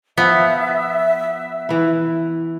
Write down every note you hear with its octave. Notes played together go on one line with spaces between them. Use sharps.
F3 B3 E5
E3 E4